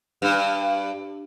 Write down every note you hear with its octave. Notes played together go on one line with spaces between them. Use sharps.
G2